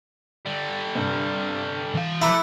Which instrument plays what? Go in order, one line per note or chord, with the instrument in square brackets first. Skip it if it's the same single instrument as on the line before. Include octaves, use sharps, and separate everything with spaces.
[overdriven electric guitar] D3 G3
[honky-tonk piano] G2 C3
[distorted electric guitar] E3 F5
[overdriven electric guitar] A3 [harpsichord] E4 [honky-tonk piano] A#5 D6 F#6